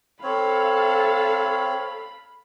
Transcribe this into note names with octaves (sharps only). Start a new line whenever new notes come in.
C4 A4 C#5 F5 B5